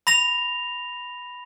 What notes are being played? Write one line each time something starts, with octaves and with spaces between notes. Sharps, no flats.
B5 A#6 F7